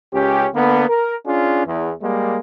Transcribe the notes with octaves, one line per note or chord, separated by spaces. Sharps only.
C#2 C#4 G4
D3 A#3 B3
A#4
C#4 D4 F4 G#4
E2
G3 G#3 A#3